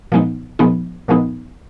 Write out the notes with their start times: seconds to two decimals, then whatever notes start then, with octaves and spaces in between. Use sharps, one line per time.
0.12 A#2 F3 G#3 B3 D#4
0.59 A#2 F3 G#3 B3 D#4
1.08 A#2 F3 G#3 B3 D#4